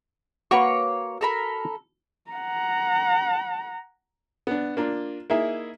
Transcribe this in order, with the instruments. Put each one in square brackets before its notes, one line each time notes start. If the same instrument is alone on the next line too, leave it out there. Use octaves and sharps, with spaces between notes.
[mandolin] A#3 C#5 C#6 [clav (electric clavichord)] F#4 B4
[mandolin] A4 A#4 B5
[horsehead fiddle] F#5 A#5
[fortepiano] B3 D4
A#3 D4 F4
A#3 D#4 E4 G#4 E5